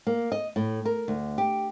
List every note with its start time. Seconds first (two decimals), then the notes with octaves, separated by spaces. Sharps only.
0.07 A#3
0.32 D#5
0.56 A2
0.85 A#4
1.08 D2
1.38 G4